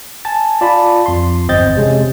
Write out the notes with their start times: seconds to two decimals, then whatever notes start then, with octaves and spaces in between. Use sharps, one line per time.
0.25 G#5 A5 A6
0.61 F4 D5 A5 B5
1.06 F2 C6
1.48 G1 E2 C4 D#5 G6 A6
1.76 C3 G#3 C#4